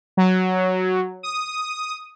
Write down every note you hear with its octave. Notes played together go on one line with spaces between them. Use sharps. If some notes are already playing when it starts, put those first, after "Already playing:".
F#3
D#6